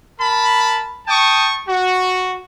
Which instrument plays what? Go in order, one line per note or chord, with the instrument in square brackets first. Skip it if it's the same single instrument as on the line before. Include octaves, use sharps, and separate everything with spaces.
[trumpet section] A#4 A5 B5
G5 A5 C#6 D#6
F#4